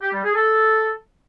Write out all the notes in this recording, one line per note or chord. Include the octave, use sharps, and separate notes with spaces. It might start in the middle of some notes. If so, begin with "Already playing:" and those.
G4
G3
G#4
A4